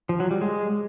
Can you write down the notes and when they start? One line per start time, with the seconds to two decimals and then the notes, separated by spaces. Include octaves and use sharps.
0.09 F3
0.20 F#3
0.31 G3
0.41 G#3